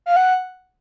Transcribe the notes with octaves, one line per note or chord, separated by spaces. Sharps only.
F5
F#5